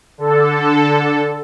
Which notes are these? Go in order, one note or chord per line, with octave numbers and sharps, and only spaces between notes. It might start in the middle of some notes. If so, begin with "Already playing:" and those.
D3 A4